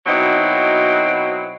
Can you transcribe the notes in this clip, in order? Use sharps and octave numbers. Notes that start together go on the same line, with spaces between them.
B2 F#3 C4 D#4 E4